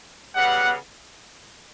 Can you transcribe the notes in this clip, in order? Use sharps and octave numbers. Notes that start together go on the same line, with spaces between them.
C#3 G3 B3 F#5